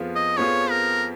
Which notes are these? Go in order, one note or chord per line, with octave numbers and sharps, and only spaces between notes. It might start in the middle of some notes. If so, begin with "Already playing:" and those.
Already playing: F2 F3 B3 F4 G#4
D#5
F2 F3 B3 F4 G#4 C#5
A#4